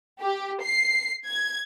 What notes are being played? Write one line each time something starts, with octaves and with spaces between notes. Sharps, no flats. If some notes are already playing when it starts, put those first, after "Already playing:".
G4
C7
G#6